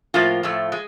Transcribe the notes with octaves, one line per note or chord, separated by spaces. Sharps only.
A2 F3 A#3 F4
A2 F3 A3
G#3